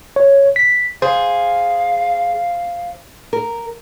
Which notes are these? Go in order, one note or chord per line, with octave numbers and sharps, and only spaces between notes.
C#5
B6
G#4 C5 F5
A#4